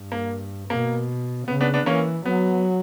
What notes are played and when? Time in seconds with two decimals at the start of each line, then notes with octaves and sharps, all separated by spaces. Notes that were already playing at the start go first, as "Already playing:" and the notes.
Already playing: G2
0.12 A#3
0.70 B2 A#3
1.47 C#3 B3
1.61 B3 D4
1.74 B3 D4
1.86 E3 A#3 C#4
2.26 F#3 B3